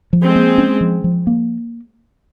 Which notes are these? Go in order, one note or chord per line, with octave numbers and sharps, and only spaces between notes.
F3
G#3 C4
A#3
C#4
F3
F3
A#3